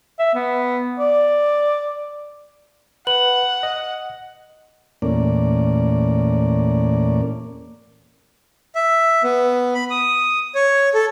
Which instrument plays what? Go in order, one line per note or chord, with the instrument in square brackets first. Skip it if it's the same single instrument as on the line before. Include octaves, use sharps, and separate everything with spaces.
[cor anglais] E5
B3
D5
[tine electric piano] B4 [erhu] F#5 [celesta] F#7
[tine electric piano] D#5
[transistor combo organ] E2 A#2 A3 A#3 C#4 D5
[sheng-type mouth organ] E5
B3
B5
D#6
C#5
A4